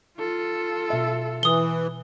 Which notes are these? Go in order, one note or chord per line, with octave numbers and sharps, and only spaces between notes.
F4 A4
B2 E5
E3 D#6 G7